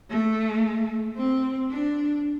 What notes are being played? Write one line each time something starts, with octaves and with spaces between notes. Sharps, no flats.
A3
C4
D4